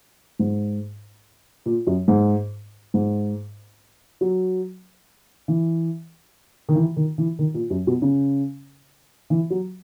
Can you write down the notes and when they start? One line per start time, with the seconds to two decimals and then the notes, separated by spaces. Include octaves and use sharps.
0.39 G#2
1.66 A#2
1.87 F#2
2.08 G#2
2.94 G#2
4.21 F#3
5.48 E3
6.69 D#3
6.75 E3
6.97 D#3
7.18 E3
7.39 D#3
7.54 A#2
7.70 F#2
7.87 B2
8.02 C#3
9.30 E3
9.50 F#3